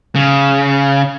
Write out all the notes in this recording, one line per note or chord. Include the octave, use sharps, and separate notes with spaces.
C#3